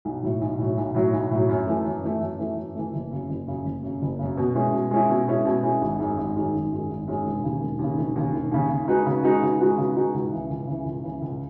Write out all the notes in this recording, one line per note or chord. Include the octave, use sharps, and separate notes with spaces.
B1
A2 F#3
B1
A2 F#3
B1
A2 F#3
B1
A2 F#3
F#2
E3 A3
F#2
E3 A3
F#2
E3 A3
F#2
E3 A3
F#1
F#2 C#3
F#1
F#2 C#3
F#1
F#2 C#3
F#1
F#2 C#3
B2
G#3 C#4 E4
B2
G#3 C#4 E4
B2
G#3 C#4 E4
B2
G#3 C#4 E4
G#1
F#2 D#3 G#3
G#1
F#2 D#3 G#3
G#1
F#2 D#3 G#3
G#1
F#2 D#3 G#3
E1
D#2 C#3
E1
D#2 C#3
E1
D#2 C#3
E1
D#2 C#3
C#3
G#3 D#4 F#4 B4
C#3
G#3 D#4 F#4 B4
C#3
G#3 D#4 F#4 B4
C#3
G#3 D#4 F#4 B4
C#2
C#3 E3
C#2
C#3 E3
C#2
C#3 E3
C#2